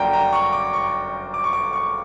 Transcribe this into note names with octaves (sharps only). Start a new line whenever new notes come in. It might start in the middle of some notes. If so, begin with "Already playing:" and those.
Already playing: G1 F#2 D3 A#3 D4 G5 A#5
A#5
C#6
D6
C#6
D6
C#6
D6
C#6